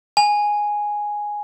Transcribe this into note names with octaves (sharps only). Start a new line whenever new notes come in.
G#5